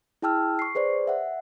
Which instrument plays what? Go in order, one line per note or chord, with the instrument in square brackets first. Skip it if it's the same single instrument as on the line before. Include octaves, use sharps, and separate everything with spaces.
[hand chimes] E4 G#4 G5 A5 E6 F6
C#6 C7
G#4 B4 C5 D5
E5 F#5